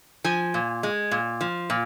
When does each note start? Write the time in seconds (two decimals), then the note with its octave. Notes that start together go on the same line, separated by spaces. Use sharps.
0.24 F3 G#5
0.54 A#2
0.83 G#3
1.11 A#2
1.41 F3
1.70 A#2